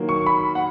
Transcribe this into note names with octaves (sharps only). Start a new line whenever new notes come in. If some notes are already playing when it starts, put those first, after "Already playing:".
Already playing: D#3 F#3 A#3
C#6
B5
F#5